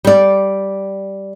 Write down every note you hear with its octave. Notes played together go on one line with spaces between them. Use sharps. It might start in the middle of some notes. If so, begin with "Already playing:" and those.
G3 D5